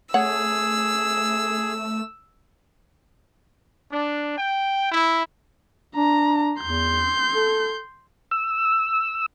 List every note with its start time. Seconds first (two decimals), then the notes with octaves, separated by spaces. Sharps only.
0.14 A3 G#4 C#5 F#5 E6
3.92 D4
4.38 G5
4.91 E4
5.96 D4 A#5
6.62 E2 C6 G6
7.35 A4
8.31 E6